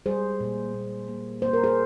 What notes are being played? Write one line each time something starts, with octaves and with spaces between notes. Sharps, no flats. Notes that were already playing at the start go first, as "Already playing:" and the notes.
G3 G#4 C5
A#2
A#2
A#3
A#3 C5
A#4
G#4 C5